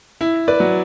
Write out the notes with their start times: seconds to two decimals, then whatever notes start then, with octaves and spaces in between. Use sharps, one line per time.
0.21 E4
0.48 B4 D5
0.60 F#3